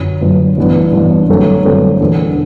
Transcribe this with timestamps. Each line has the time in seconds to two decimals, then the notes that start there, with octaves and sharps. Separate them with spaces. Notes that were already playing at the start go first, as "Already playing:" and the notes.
Already playing: G1 F#2 F#3
0.22 G1 F#2 F#3
0.58 A1 G2 E3 B3 D4
0.93 A1 G2 E3 B3 D4
1.28 G1 G2 F#3 A3 C4
1.64 G1 G2 F#3 A3 C4
2.00 E1 E2 D3